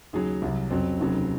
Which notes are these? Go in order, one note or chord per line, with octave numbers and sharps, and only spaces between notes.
D#2 C#3 F#3 G#4
C2 C3 F#3
F2 C#3 F#3 C4
F1 D#2 C#3 F#3